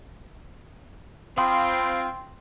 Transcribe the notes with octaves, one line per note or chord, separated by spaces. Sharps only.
C4 F4 F5 G5 B5 C6 D#6